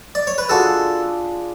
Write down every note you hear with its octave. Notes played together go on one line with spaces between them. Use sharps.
D5
C#5
B4
G#3 D4 F4 F#4 G#4 A4